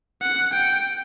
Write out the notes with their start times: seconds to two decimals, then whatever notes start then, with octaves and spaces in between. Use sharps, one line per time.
0.22 F#5
0.54 G5